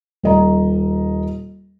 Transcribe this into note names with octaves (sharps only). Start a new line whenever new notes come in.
D#1 D#5 A#5